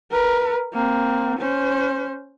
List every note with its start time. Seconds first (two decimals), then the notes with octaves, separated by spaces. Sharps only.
0.11 A#4 B4
0.73 A#3 C4
1.39 C#4 C5